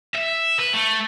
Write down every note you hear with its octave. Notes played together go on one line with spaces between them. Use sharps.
E5
B4
A3